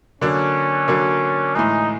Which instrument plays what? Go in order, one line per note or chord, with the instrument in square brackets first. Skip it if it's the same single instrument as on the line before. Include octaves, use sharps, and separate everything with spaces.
[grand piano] D3 F#3 A#3 D4 [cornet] C#4
[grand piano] D3 F#3 A#3 D4
[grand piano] A2 E3 G#3 [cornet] D#4